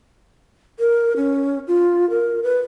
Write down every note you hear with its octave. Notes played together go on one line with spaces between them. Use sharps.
A#4
C#4
F4
A#4
B4